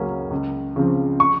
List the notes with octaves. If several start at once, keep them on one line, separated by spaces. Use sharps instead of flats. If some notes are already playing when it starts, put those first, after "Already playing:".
Already playing: C#2 C#3 F#3 A#3 C#4
C#2
C#3 F3 C4
C#6